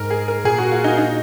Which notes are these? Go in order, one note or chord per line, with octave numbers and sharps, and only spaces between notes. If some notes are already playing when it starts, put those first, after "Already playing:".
Already playing: G#2 A#4
G#4
A#4
A#2 G#4
F#4
F4
D#4
D#4